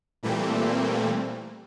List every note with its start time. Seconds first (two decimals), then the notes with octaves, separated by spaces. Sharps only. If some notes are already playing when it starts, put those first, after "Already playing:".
0.23 A#2 E3 G3 A3 A#3 C4